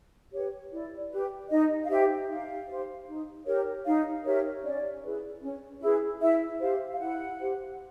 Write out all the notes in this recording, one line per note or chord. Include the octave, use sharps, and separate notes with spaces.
G4 B4 C#5
E4 D5
G4 B4
D#4 D#5
F5
G4 C5 E5
D#4 F5
G4 C5
D#4
G4 A#4 C#5
D#4 F5
G4 A#4 C#5 E5
C#4 D5
E4 G#4 B4
C#4
E4 G#4 B4
E4 E5
G4 C5 F5
F5
E4 F#5
G4 C5